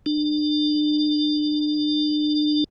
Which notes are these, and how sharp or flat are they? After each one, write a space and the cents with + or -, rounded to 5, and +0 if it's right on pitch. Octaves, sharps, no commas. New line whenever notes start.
D4 +35